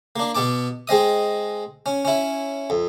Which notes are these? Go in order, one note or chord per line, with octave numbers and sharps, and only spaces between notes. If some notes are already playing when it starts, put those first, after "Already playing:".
A#3 D4
B2 B3 A5 D6
G#3 C4 D#5 D#6
C#4
C#4 E4
F2